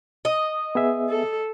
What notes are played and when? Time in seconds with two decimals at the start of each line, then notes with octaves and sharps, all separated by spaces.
0.25 D#5
0.75 B3 G#4 E5
1.09 A4